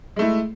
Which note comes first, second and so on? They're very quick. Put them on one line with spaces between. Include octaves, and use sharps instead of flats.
G#3 A3 E4